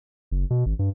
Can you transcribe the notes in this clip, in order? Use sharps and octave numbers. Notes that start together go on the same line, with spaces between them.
F#1
B2
G#1
G2